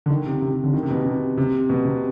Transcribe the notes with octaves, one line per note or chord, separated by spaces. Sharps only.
D3
D#3
C3
C3
C3
D3
D#3
C3
B2
C3
C3
B2
C3